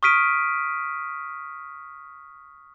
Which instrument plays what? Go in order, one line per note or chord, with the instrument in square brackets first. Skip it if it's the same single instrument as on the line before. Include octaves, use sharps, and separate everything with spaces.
[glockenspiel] C#6 D#6 F6 B6 D7 D#7